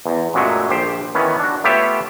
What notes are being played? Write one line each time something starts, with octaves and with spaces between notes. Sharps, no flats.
E2
F#2 A#2 F#3 G#3 A3
A#1 G4 C5
D#3 E3 B3 C#4
D4 F#4
A3 B3 F4 G4 C#5 E5